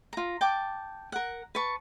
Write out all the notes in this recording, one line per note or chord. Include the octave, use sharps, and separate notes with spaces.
F4 A#5
G5 A5 D6
A#4 F#5
B4 A5 C#6